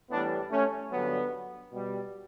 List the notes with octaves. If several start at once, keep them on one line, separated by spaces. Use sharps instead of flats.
A2 E3 G3 B3 D4
A3 C#4
G2 D3 F#3 B3
B2 G3